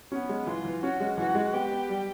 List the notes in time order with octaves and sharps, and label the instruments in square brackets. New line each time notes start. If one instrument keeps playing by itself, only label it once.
[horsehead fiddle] B3 [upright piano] C#4
[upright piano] G#3
[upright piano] E3 [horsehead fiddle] F4
[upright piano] E3
[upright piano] C#4 [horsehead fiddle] F#4
[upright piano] G#3
[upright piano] E3 [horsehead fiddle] F#4
[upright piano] G#3
[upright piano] B3 [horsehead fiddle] G4
[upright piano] B3
G3